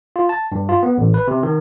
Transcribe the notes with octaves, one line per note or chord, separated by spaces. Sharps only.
F4
A5
G2
F4
B3
A1
B4
C3
D#3